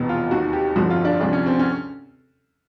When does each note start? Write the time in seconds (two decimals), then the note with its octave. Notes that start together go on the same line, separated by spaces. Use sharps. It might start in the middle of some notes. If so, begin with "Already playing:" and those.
Already playing: F1 E2 B2
0.09 F4
0.31 D#2 D#3 F#4
0.53 G4
0.76 G1 F2 D3 F3 F#4
0.90 F4
1.05 D4
1.20 D2 C3 F3 D4
1.33 C#4
1.46 C4
1.59 C#4